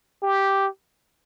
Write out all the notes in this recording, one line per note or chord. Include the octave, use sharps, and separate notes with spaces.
G4